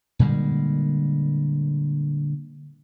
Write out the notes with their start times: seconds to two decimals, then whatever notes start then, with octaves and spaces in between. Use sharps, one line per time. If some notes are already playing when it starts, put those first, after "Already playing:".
0.19 A#2 D3 G3 G#3